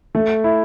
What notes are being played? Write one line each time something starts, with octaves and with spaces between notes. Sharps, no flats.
A3
E4